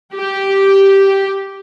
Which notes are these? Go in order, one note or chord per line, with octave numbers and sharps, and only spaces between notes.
G4